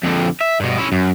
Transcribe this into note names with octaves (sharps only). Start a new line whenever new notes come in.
F2 D3
E5
G2 B2
C#4 E4
F#2